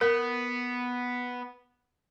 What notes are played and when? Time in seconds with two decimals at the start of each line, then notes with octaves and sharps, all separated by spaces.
0.01 B3 A#4